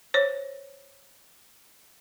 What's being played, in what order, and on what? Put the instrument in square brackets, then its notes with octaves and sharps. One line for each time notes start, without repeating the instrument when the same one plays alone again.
[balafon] C5 C#5